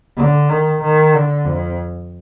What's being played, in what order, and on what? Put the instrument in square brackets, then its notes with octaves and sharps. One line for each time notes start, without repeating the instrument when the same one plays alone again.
[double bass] D3
D#3
D#3
D3
F2